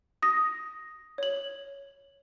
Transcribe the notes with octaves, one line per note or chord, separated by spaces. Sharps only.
D#6 A#6
C#5 F#7